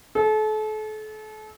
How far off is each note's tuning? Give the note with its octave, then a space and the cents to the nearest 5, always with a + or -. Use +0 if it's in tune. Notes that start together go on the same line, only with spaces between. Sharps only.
A4 -35